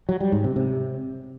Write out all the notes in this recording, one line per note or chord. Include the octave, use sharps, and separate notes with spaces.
F#3
G3
G#2
C3
C3